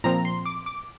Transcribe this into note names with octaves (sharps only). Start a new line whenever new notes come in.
A#2 F3 C4 A#5
C6
D6
D6